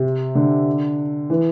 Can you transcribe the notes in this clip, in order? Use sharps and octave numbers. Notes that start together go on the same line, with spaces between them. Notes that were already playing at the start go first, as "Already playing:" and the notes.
Already playing: C3
D3
E3